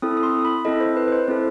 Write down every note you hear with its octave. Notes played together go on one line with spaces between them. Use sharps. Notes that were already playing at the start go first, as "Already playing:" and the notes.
C4 E4 A4 D#6
D#6
C6
B5
C4 E4 A4 D#5
C5
B4
B4
C5
C4 E4 A4 C5